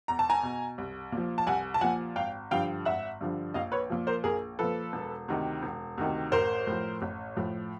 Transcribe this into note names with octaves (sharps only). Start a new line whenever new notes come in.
E2 A#5
A5
G#5 A#5
B2
C2
A#2
F3
A5
C2 F#5 G#5
A5
A#2 F3 F#5 G#5
G#1 F5 G5
G2 D3 F3 F5 G5
G#1 E5 F#5
G2 D3 F3
A#1 D#5 F5
B4 C#5
A#2 F3
A#4 C5
A#1 G#4 A#4
A#2 F3 A4 B4
E1
D2 C3 D#3
E1
D2 C3 D#3
A1 A#4 C5
A2 F3
A1
A2 F3